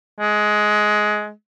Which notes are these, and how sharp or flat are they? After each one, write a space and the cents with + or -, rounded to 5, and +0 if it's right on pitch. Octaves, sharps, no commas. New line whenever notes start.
G#3 +15